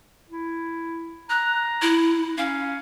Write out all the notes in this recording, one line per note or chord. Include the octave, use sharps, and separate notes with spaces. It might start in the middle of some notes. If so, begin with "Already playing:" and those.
E4
A#5 F#6
E4
C#4 F5